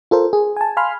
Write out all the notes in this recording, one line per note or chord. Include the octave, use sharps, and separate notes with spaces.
F4 A4 A#4 C5
G#4
G#5 A5
F5 G#5 B5 C6 F6